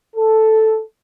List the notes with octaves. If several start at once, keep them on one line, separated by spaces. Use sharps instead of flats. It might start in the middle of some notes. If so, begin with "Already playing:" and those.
A4